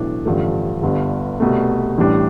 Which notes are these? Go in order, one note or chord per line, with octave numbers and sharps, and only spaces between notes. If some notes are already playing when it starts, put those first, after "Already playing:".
Already playing: B1 A2 E3 A3 D4
A1 G2 D3 F3 A3
G1 G2 D3
C2 B2 A3
A1 A2 G3 D4